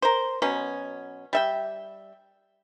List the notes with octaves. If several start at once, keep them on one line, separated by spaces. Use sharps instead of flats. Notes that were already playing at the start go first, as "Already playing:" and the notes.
A#4 C5
B2 F#3 B3 C#4
G3 E5 G5